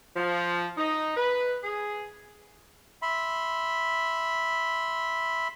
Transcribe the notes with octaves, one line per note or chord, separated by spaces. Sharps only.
F3
D#4
B4
G#4
E5 B5 C6